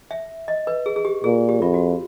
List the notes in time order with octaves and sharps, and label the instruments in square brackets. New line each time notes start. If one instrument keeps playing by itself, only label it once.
[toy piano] E5
D#5
B4
G#4
G#4
G4
[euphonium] A#2 [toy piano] G#4
[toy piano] G4
[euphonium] F2 [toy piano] F4
[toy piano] F#4